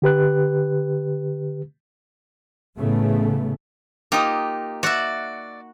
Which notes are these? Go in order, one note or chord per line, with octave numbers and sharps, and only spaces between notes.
D3 G4 B4 F#6
A1 A2 C#3 A3 B3
A#3 D#4 F4 G4 D#6
F#4 D5 E5 F#5